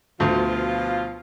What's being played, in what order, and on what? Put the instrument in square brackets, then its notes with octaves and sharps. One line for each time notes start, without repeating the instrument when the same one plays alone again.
[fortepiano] D2 [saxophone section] B2 F3 F4